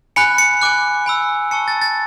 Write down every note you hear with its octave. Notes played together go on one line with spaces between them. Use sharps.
G#5 B5 F#6 C#7
C#7
G#5 D6 F#6
G#5 B5 E6
A5 C#6 E6 C#7
A6
A6